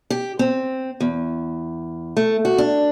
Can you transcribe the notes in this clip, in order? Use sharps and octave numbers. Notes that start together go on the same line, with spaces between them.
G4
C4
E2
A3
F#4
D4